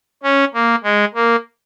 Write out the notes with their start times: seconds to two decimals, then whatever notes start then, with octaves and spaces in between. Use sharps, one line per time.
0.23 C#4
0.54 A#3
0.84 G#3
1.15 A#3